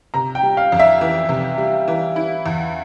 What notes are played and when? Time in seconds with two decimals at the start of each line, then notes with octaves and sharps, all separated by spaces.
0.14 C3 A#5
0.35 G5
0.43 G3
0.57 F5
0.72 F2
0.79 E5
1.01 E3
1.29 C3
1.58 G3
1.88 E3
2.16 E4
2.46 E2